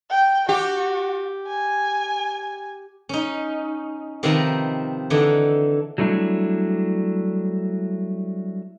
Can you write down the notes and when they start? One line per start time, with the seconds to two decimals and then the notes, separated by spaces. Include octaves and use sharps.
0.11 G5
0.49 F#4 G4
1.48 G#5
3.09 C#4 D#4
4.23 C3 D#3 F3 C4 B4 A#5
5.10 D3 E3 D4 D#4
5.98 F#3 G3 A3 D4 E4